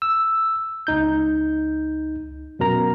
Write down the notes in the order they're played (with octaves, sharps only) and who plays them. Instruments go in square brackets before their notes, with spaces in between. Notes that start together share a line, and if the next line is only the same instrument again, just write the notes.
[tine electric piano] E6
C#2 D#4 G6
F#2 B2 A#4 A#5